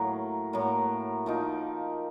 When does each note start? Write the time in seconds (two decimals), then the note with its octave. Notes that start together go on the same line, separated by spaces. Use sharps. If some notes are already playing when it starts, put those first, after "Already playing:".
Already playing: A2 F#3 A#3
0.53 A2 F#3 A#3
1.26 F3 A#3 D#4